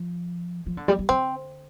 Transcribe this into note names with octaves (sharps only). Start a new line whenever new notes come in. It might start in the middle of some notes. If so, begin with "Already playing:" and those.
Already playing: F3
F3
D3
G3
G3
D3 C4